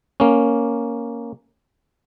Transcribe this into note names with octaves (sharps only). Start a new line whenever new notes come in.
A#3 C#4